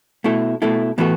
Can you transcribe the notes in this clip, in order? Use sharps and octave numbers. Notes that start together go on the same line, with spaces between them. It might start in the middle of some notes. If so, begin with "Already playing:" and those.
B2 A3 E4 A4
B2 A3 E4 A4
A2 E3 B3 F#4 A4